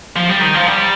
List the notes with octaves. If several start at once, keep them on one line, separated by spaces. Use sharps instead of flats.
F3
G3
D#3
F3
G3